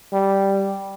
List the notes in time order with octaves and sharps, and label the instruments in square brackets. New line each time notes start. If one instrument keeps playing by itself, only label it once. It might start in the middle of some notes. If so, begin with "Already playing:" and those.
[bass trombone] G3